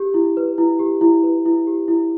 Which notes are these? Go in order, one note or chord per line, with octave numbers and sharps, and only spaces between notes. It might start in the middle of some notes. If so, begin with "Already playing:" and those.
Already playing: G4
E4
B4
E4
G4
E4
B4
E4
G4
E4